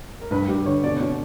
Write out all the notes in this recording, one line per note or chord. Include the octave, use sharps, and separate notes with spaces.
A#4
G2 B4
G2 G4
D3 C#5
B2 D5
B2 C#5